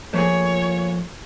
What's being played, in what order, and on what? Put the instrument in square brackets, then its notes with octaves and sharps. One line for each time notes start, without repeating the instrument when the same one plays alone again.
[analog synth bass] F3 [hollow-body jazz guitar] A3 A#3 G#4 [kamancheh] C#5